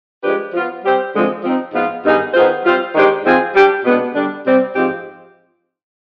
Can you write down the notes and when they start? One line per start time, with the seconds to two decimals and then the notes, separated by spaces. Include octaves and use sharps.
0.23 F3 G#3 D4 G4 B4
0.54 F3 B3 F4
0.84 G3 C4 G4 C5
1.14 D3 F3 G#3 C4
1.44 F3 C4 D#4
1.74 G#2 F3 B3 F4
2.04 G2 D#3 B3 D#4 G#4
2.34 D#3 B3 F4 G#4 C5
2.64 G3 C4 F4 C5
2.95 D#3 G#3 D4 G4 C5
3.24 G#2 F3 C4 F4 G#4
3.55 G3 D4 G4
3.84 B2 G#3 B3 D4
4.15 D3 G3 D4
4.45 C3 G3 C4
4.75 G#2 F3 C4 D#4 G4